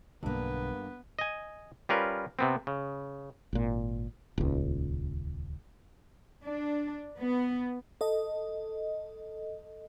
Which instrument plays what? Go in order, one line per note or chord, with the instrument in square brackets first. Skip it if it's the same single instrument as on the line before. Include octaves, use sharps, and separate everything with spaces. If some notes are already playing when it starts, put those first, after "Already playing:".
[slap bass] B1 D3 [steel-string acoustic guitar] G2 A#3 [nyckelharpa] B3 B4
[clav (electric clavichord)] D#5 G#5
G3 C#4 F4 A#4 B4
C3 B3 C4
C#3
[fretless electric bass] G#1 A#2
D#1 C#2
[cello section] D4
B3
[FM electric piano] A4 D#5